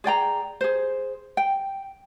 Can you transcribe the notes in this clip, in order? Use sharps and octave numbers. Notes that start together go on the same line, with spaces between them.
G#4 D5 G5 A#5
G#4 C5
G5